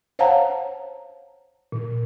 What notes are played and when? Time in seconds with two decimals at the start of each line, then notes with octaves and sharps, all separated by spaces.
0.19 C5 C#5 F5 F#5 A5 A#5
1.72 A#2